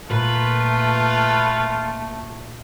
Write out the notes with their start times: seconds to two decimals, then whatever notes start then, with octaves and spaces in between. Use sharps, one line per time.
0.11 A#2 A3 F4 B4